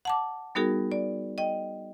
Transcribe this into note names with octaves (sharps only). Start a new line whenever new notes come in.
F#5 A5 D6
G3 B3 D#4 F#4 G#4 A#4
D5
D#5 G5